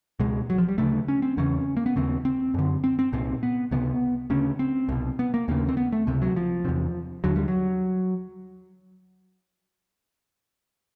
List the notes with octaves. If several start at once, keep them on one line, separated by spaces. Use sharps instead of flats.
C#2 B2 G#3
F#3
F3
G3
D2 C#3 A3
C#4
C4
E2 C#3 C#4
A#3
B3
D#2 C#3 C4
C4
F#2 D3
C4
C4
C2 A#2 C4
B3
C#2 C3 B3
D2 C#3 C#4
C4
C2 B2
B3
A#3
D#2 C#3 A#3
C4
B3
A3
C#2 C3
F#3
F3
E2 C3
D#2 D3 F#3
G3
F#3